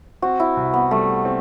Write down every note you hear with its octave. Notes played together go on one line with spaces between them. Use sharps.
C4 F#4
E4
C2
B3
G3 A3
C4